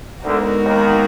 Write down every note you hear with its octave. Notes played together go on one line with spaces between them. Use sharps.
D2 D3 G#3 B3 D#4 F#4 A#4
D#2 D#3